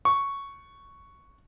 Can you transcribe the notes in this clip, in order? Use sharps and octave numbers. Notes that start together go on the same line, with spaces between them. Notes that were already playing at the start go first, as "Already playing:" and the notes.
C#6